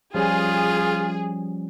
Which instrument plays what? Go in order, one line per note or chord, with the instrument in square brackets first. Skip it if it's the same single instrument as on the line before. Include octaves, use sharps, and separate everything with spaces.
[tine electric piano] F3 G3 C#4 [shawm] F4 [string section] G#4